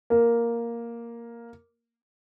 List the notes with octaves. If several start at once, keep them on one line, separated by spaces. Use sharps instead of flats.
A#3